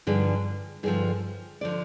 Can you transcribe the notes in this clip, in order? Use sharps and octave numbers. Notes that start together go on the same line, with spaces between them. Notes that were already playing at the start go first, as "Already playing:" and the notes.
G2 D3 F3 G#4
G2 D3 F3 G#4
D3 F3 D5